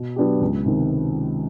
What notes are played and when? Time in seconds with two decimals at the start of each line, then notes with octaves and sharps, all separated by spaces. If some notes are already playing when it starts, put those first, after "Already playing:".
Already playing: B2
0.16 F#3 B3 D4 G4
0.41 C#2
0.66 C3 D#3